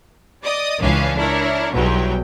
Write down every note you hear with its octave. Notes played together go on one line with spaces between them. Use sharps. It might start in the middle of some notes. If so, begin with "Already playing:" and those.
D5 D#5 D#6
C#2 E3 C#4 D4 F5
D4 E4 A#4 C#5
B1 E2 F#3 G3 G5